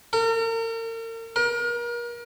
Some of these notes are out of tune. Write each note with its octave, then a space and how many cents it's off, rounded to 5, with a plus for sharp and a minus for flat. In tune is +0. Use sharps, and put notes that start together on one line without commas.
A#4 -40
A#4 +35